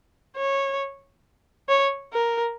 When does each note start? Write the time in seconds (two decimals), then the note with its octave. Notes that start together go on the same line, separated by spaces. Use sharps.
0.36 C#5
1.69 C#5
2.13 A#4